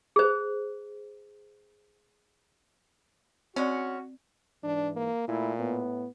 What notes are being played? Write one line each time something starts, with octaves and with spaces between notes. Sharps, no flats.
G#4 C5
G#3 C4 C#4 F#4 D5
G#2 E3 D4
A#3
A#2 A3 E4
A2 B3